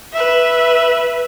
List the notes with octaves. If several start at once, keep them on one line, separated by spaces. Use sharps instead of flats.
B4 E5